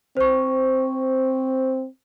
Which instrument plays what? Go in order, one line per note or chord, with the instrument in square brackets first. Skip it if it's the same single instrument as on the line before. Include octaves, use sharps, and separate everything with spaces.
[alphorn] C4 [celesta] C5 C#6